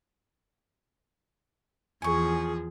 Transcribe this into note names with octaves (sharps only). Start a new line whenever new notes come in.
E2 F3 G#4 G#5 C#6